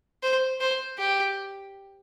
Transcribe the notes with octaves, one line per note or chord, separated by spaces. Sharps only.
C5
C5
G4